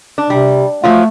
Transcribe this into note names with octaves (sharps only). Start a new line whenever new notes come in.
D4
C3 G3
F3 F#3 A3 F4